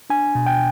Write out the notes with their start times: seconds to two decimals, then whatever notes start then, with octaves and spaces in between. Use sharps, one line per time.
0.10 D4 G#5
0.35 B2
0.47 G5